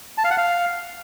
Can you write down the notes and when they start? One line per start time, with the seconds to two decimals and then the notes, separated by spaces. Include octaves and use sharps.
0.18 A5
0.24 F5
0.31 F#5
0.37 F5